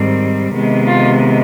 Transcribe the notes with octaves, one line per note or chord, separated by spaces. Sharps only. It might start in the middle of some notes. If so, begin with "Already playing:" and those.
Already playing: G#2 D#3 G3 C4
C3 D#3 G#3 B3
F4